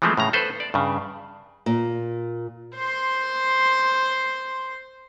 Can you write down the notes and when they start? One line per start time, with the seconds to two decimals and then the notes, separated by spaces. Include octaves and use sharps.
0.02 E3 F3 G#3 A3 C4
0.17 A2 C#3 A#5
0.33 A4 B4 C5
0.60 D5
0.74 G2 C#3
1.66 A#2
2.76 C5 C6